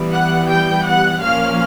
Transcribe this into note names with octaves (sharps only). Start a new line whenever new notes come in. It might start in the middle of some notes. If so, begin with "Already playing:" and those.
Already playing: E3 G3 B3
F#5 F#6
G5 G6
F#5 F#6
A#2 F3 A#3 C#4 F5 F6